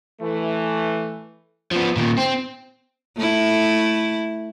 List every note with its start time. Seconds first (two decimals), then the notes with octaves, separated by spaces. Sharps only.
0.22 E3 A3
1.71 F3 B3
1.97 A#2 D#3
2.18 C4
3.18 A3 E4